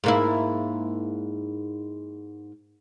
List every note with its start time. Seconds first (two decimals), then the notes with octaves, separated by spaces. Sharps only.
0.04 G#2 A#3 E4